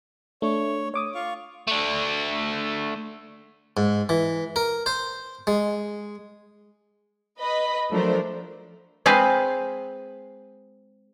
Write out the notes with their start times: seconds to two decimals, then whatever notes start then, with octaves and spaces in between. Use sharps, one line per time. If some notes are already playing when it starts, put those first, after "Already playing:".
0.42 A3 D4 C#5
0.94 C#5 D6 D#6
1.15 F4 F5 C#6
1.67 A3 D4
3.77 G#2
4.09 E3
4.56 A#4
4.86 C5
5.47 G#3
7.40 B4 D#5 B5
7.91 F3 F#3 A3 D4 A#4 C5
9.06 G#3 C4 G#4 B4 F5